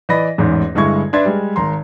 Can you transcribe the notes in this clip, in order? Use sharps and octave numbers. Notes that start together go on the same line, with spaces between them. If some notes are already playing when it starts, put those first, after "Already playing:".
E3 D5 D#5 B5 A#6
A1 E2 G#2
G1 G2 G#3 E4 C#6 G#6
D4 B4 D5 E5 C6 G#6
G3 G#3
G#1 A#5 C6